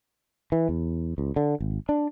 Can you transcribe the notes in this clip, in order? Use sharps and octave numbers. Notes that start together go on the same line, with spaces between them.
E3
E2
C#2
D3
G#1
D4